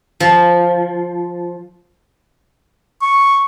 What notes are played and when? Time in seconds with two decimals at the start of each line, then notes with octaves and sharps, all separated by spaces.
0.20 F3
3.02 C#6